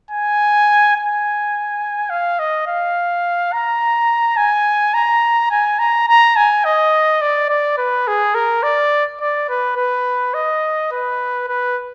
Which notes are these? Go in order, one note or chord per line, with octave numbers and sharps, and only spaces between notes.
G#5
G#5
F5
D#5
F5
A#5
G#5
A#5
G#5
A#5
A#5
G#5
D#5
D5
D5
B4
G#4
A#4
D5
D5
B4
B4
D#5
B4
B4